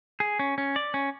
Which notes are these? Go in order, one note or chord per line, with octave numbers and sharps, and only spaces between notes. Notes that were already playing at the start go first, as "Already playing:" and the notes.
G#4
C#4
C#4
D5
C#4